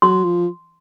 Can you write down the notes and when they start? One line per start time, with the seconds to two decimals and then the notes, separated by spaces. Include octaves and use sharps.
0.02 F#3 C6
0.24 F3